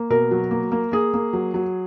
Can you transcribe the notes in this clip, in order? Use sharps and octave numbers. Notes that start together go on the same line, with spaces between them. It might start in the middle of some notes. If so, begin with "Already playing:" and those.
Already playing: A#3
B2 A#4
F#3
A#3
A#3
A#3 G#4
A#3
F#3
F#3